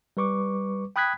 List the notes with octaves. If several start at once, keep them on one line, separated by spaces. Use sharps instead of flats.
G3 B4 C#6 D6
G5 B5 D#6 F#6 G#6 B6